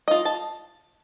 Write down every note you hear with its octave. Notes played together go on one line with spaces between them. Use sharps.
F4 D#5
A5